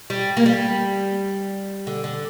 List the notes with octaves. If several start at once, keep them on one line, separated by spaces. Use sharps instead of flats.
G3
A#3
G3
D3
D3